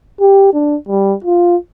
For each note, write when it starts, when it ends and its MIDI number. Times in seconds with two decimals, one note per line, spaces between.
0.21 0.52 67
0.54 0.76 62
0.88 1.14 55
1.24 1.56 65